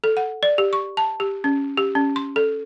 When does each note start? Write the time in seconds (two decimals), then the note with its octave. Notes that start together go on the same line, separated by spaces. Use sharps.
0.04 A4
0.17 F#5
0.43 D5
0.58 G4
0.73 C#6
0.97 A5
1.20 G4
1.44 C#4
1.77 G4
1.95 C#4
2.16 C6
2.36 A4